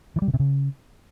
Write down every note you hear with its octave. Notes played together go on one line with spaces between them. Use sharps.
E3
G3
C#3
C3
C#3